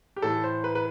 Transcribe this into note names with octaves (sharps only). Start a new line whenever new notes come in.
G4
A2 E3 A4
C5
B4
B4